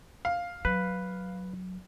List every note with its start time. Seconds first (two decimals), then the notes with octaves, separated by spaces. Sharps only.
0.25 F5
0.65 F#3 B4